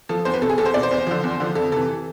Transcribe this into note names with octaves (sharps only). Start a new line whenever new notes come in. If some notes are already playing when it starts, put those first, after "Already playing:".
F3 A4
E2 C5
B4
B2 A4
G#4
E2 A4
C5
B2 D5
C5
E2
D3 F3
E2
D3 F3
F2 A4
C3 E3 A4